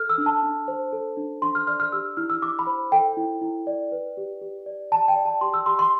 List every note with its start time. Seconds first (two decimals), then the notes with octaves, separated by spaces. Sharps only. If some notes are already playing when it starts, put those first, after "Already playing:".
Already playing: A4 F6
0.10 E6
0.18 D4
0.26 A5
0.42 D4
0.68 C5
0.93 A4
1.17 D4
1.42 D4 C6
1.55 F6
1.67 D5 F6
1.80 F6
1.92 G4 E6
2.17 E4 F6
2.30 E6
2.42 E4 D6
2.59 B5
2.67 C5
2.92 A4 G5
3.17 E4
3.42 E4
3.67 D5
3.92 B4
4.17 G4
4.41 G4
4.66 D5
4.91 D5 A5
5.08 G5
5.16 D5
5.25 A5
5.41 G4 C6
5.54 E6
5.66 G4 C6
5.79 C6